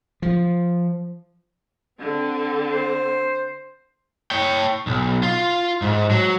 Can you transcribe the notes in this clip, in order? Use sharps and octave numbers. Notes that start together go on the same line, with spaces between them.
F3
D3 C4
C5
C#5 G5
B1
F4
G#2
F#3